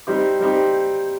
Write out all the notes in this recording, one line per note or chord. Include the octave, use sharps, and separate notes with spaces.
G3 C4 D#4 G4
G3 C4 D#4 G4